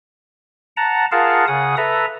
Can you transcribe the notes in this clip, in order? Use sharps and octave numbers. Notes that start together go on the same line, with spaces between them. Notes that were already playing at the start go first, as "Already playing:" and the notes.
F#5 A5 A#5
F4 G#4 A#4 F5 F#5 A5
C#3 G#4 F#5 D#6
A4 B4 E5 A#5